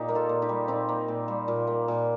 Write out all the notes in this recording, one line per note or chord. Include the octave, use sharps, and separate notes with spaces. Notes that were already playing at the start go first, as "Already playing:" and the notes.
Already playing: A#2 D#4 G4
A#3 A#4
F4 A4
A#2
D#4 G4
G3
A#2 C4 D#4
A#3
A#2
G3
A#2
A#3
A#2